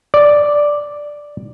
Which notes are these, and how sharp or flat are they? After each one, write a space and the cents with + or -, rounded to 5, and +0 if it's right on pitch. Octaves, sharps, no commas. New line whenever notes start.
D5 +0